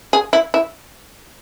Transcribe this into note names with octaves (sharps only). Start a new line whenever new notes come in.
G#4
E4
E4